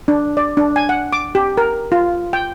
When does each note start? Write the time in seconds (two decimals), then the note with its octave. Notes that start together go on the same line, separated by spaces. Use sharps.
0.08 D4
0.37 D5
0.57 D4
0.76 G#5
0.89 F#5
1.13 D6
1.35 G4
1.57 A#4
1.92 F4
2.33 G5